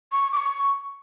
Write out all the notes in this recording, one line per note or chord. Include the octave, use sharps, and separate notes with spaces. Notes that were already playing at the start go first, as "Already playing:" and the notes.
C#6
D6
C#6